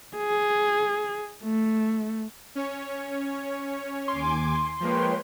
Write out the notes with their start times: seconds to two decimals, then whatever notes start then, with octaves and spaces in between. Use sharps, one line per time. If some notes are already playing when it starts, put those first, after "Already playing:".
0.16 G#4
1.44 A3
2.55 C#4 C#5
4.08 D#2 G#5 C6 D6
4.80 F3 G#3 A#3 B4 C#5 G5